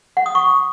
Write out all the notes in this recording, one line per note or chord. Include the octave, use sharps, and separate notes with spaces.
F#5
D#6
C#6